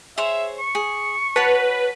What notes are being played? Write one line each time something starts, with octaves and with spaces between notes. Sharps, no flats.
G#4 C5 C#5 E5
C#6
G#4
F#4 B4 C#5 A5